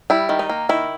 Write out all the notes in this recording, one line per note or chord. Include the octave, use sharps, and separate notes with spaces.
G3 E4
D#3
D#4
A#3
D#3 E4